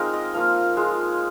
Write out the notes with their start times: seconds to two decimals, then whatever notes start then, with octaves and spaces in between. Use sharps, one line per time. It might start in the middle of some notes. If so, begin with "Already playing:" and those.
Already playing: G#3 C4 D#4 F4 A#4
0.13 D#5
0.34 F3 A#3 F4 F5
0.77 G#3 F4